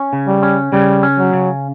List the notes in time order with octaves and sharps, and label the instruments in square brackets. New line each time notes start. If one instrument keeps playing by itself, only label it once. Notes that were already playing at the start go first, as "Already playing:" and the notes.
Already playing: [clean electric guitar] C#4
C#3
[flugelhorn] G3
[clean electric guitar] C#4
[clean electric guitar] C#3 [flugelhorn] G3
[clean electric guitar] C#4
[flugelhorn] F#3
[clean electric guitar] C#3